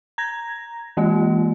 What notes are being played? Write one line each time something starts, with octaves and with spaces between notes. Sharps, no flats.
A#5 G#6 A#6
E3 G#3 A#3 F4 D#5